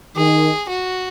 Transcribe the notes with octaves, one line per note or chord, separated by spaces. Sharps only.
D#3 G#4
F#4